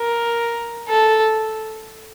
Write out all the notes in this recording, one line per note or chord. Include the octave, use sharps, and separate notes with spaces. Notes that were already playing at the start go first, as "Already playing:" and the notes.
Already playing: A#4
A4